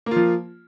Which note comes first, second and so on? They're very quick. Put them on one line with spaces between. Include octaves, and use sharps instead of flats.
A#3 F4 F3